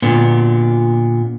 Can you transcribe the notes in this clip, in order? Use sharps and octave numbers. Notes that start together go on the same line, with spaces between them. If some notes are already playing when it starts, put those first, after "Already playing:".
A#2 D3 B3